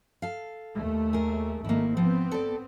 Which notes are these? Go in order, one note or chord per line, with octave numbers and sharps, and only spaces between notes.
A4 F5
D#2 A3
G#4 A#4
G#1 D#3 A3 A#3 E4
F3 B3 C4
A4 D5